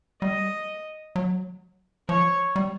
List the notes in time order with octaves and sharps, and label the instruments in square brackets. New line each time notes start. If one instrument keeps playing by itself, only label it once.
[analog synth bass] G3 [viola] D#5
[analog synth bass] F#3
[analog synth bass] F3 [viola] C#5
[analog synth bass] G3